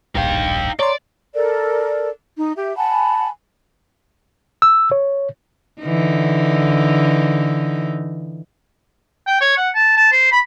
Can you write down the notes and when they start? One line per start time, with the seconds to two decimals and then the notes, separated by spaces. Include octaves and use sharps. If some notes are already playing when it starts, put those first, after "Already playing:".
0.15 D1 A#1 G2 D#4 F5 G5
0.79 C#5 D5 A#5 C6
1.34 A4 A#4 D5
2.37 D#4
2.56 G4 E5
2.77 F#5 G#5 A5 B5
4.62 E6
4.92 C#5
5.82 D3 E3 D#4
9.27 G5
9.41 C#5
9.57 F#5
9.75 A5
9.97 A5
10.12 C5
10.32 B5